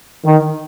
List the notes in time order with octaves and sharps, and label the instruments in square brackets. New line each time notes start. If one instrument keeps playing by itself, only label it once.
[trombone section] D#3